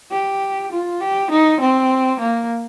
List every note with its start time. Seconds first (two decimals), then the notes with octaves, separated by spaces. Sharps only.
0.11 G4
0.72 F4
1.01 G4
1.31 D#4
1.60 C4
2.20 A#3